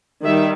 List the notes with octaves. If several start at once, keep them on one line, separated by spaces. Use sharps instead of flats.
D#3 G3 E5